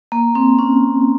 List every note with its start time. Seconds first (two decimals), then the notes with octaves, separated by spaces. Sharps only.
0.12 A#3
0.35 C4
0.59 C#4